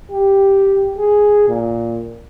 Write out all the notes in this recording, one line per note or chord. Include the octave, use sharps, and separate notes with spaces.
G4
G#4
A#2